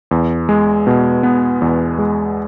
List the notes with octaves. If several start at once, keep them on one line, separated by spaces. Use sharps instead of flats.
E2
G#3
B2
B3
E2
G#3